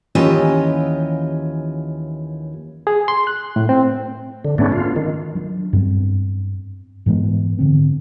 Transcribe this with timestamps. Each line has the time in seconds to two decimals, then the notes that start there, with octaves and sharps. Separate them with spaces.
0.15 D#2 E3 C#4 F4 G4 D#5
2.87 G#4
3.08 C6
3.27 F#6
3.56 A2
3.69 C4
4.45 D3
4.58 G#2 A3 B3 C#4 D4
4.72 F4
4.96 D#3
5.35 F#3 D4
5.73 G2 B3 C4
7.06 G#2 E3 G#3 B3
7.59 G#2 D3 C4